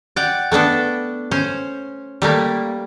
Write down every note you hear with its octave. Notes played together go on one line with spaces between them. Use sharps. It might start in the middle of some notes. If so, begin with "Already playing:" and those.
D5 F#5 G5
A3 B3 D4 A4
C#4 C5
G3 A3 A#3